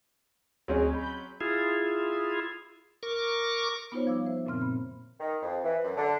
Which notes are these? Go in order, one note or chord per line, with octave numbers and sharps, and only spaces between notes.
D2 F#3 C4 C#4 G#4 D#5
B5 G6
E4 F4 G#4
A#4 C#6 D6
B3 D#4 F4 F#4 C5 C#5
F3 G3 F5 D6 E6
C5 E5
F#2 A#2 C#3 C4 F6
A#3 B5
D#3
F2
E3
F#2
D3